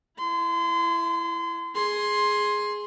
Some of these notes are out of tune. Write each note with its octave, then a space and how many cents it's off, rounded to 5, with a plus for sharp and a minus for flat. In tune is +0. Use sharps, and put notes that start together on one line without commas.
E4 +20 C6 -30
G#4 +0 C6 +10